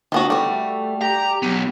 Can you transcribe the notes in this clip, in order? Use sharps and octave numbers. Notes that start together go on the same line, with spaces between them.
D3 D#3 B3 F#4
G3 A3 F#4
G4 A#5
F#3 B3